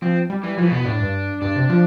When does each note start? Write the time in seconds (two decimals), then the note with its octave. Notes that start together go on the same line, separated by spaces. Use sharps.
0.02 F3 C4
0.30 G3
0.43 E3 G3
0.58 E3 F3
0.66 A3
0.72 B2 B3
0.85 A2 D4
1.00 G2
1.42 G2 D4
1.56 C3
1.69 F3